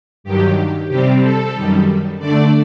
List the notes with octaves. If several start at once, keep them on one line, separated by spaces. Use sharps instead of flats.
G2 D#3 F#3 G4
C3 G3 C4 G4
A4
F#2 D#3 G3
D3 A3 D4 D5